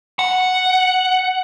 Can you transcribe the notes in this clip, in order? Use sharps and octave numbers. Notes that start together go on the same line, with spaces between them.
F#5